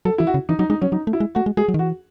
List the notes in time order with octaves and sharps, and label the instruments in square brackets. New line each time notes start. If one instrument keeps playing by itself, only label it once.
[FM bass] F#3 [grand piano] A4
[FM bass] E3 [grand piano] E4
[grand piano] F#4
[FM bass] C#3
[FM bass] E3 [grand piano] D#4
[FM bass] F#3 [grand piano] D#4
[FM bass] G#3 [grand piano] D#4
[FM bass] F#3 [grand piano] C#4
[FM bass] F#3 [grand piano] D#4
[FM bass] A3
[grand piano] E4
[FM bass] G#3
[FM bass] A3 [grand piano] F#4
[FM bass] G#3
[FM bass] G#3 [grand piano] G#4
[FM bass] F#3
D#3
[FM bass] E3 [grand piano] F#4